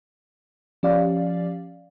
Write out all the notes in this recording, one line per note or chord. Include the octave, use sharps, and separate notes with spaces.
F3 C#4 G4 D5 F5